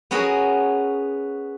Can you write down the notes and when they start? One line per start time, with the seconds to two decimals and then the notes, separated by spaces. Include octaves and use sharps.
0.11 B3 C#4 F#4 G#4 A#4